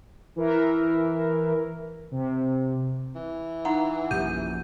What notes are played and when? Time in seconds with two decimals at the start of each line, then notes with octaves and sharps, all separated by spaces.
0.36 E3 A#4 E5
2.11 C3
3.15 E3
3.65 D#4 F5 F#5 A#5
4.11 A#1 F#2 G4 G6 D#7